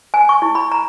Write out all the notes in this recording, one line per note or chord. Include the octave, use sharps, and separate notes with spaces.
G#5
C#6
E4
B5
A#5